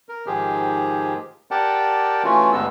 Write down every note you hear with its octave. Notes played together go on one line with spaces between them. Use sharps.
A#4
G#2 D#3 F3 G4 G#4
G4 A#4 D5 F#5 G5 A5
E3 A3 C#4 F4 F#4
D2 G2 G3 G#3 B3 E6